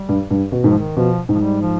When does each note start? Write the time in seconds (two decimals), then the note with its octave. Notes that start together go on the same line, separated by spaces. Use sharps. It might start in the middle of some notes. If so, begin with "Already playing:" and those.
Already playing: G3
0.09 G2
0.30 G2
0.52 B2
0.64 G#2 D#3
0.71 F3
0.78 D#3
0.97 B2 F3
1.29 G#2
1.35 F3
1.40 G3
1.62 F3